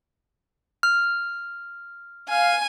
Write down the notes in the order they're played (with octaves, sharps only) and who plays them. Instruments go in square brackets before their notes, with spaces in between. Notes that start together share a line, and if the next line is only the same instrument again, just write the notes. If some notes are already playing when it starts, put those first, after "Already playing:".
[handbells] F6
[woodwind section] F5 [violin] G#5